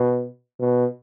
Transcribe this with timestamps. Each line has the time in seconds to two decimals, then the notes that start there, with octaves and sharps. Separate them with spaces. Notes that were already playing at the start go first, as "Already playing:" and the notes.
Already playing: B2
0.60 B2